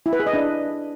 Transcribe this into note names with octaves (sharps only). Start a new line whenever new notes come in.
E4
B4
G#4
D#5
D4